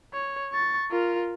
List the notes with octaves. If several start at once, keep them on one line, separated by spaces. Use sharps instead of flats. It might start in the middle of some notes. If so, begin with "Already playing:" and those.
C#5
C#6 A6
F4 A#4